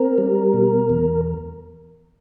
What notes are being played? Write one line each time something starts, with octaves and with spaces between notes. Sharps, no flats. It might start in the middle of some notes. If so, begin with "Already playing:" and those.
Already playing: C4 A#4
G3
B2
E2